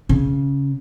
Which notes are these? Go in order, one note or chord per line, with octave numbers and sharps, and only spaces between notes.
C#3